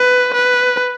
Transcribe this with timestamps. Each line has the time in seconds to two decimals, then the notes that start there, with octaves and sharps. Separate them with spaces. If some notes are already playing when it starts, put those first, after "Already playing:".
Already playing: B4
0.34 B4